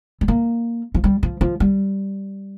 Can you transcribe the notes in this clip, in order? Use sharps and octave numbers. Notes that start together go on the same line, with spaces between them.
G3
A#3
F3
G3
F3
F3
G3